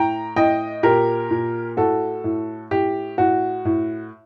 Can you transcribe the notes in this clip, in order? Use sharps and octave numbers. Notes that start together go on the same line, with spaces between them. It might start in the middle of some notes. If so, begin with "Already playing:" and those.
Already playing: A2 G5 A#5
A2 D#5 G5
A#2 G4 A#4
A#2
A2 F#4 A4
A2
A2 G4
A2 F#4
A2